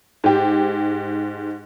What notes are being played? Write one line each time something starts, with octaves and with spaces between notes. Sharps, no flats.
G#2 G4